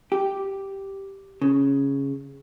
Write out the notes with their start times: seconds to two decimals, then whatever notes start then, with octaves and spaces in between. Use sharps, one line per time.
0.12 G4
1.42 C#3